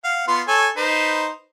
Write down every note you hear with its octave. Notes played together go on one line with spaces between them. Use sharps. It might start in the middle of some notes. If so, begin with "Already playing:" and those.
F5 F#5
B3 F4 C6
A4 C#5 G#5
D#4 B4 C5